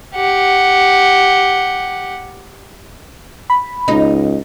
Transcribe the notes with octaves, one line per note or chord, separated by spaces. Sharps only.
G4 F#5
B5
C#2 D#4